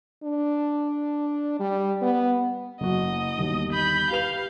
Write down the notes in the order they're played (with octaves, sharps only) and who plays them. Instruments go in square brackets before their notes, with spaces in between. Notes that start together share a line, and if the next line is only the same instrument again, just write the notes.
[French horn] D4
G3
B3
[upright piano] F#1 F#4 [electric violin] D#5
[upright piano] G1 D#2
[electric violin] B5 G6
[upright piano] G4 B4 F7 [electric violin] F5